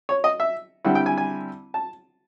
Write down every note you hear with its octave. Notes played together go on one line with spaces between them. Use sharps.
C#5
D#5
E5
D3 G3 C4 E4 F#5
G5
G#5
G#5
A5